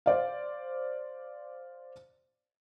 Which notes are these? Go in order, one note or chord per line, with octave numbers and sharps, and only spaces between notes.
C5 D5 F5